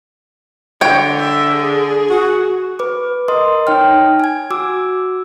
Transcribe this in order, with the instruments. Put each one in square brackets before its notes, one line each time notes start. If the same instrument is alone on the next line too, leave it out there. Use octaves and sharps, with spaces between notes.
[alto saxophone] D3 [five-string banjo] C#5 G5
[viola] E5
G#4
[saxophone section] F#4
[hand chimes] B4 D6
A#4 D#5 C6 D#6
D#4 C#5 G5 F6
G#5 G#6
F#4 D6 E6